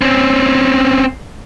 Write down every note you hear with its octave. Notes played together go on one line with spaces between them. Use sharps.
C4 C#4